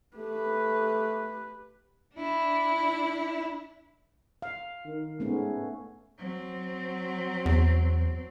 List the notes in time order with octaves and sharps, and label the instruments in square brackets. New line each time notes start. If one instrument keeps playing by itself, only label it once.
[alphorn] A3 [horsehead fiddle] G4 B4
[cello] D4 E4
[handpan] F5
[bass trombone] D#3
[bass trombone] G#2 [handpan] A3 B3 C#4
[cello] F#3 C4
[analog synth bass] E2